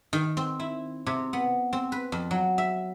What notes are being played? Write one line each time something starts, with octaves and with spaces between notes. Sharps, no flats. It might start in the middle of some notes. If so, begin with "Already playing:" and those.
D#3
C4
E4
C3
B3
C4
B4
F2
F#3
E5